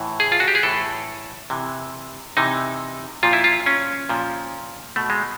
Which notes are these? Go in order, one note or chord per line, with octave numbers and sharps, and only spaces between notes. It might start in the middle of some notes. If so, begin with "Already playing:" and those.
Already playing: A2 E3
G#4
F4
F#4
G4
G#4
A2 E3 A4
C3 E3
C3 E3 D#4
A#2 F3 F4
E4
F4
C#4
A#2 F3
B2 A3
G#3